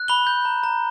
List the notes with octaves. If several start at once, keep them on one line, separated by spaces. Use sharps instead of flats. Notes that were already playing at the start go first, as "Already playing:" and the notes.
Already playing: F#6
B5 G7
G6
A#5
A#5